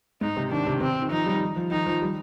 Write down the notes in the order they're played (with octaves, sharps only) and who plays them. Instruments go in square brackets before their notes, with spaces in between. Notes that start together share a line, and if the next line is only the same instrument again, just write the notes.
[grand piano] G#2 [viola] D#4
[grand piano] C3
[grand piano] D#3 [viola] D4
[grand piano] C3
[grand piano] C3 [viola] C4
[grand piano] D#3
[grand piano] F3 [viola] D#4
[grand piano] G3
F3
[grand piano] D#3 [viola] D#4
[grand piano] F3
G3